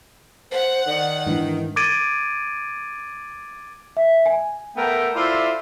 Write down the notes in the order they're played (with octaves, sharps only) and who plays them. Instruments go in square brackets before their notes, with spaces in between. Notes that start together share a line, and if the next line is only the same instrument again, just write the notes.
[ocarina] C5 [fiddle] F#5
[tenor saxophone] D#3 [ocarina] D5
[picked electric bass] G#2 E3 [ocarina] D4
[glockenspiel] D6 G#6 A6 D7 D#7
[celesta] E5
G#5
[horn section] A3 B3 A4 A#4 G5
E4 F4 A4 C5 D5 E5